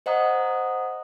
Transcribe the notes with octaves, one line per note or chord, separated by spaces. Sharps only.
C5 D#5 F#5 A#5 D#6